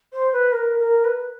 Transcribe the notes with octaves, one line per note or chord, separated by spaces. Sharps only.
C5
B4
A#4
A#4
B4